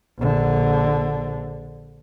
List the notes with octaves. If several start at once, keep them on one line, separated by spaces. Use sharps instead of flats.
A#1 D3